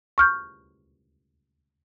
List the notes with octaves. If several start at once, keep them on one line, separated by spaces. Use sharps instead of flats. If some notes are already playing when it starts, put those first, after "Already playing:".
C#6 F6 G6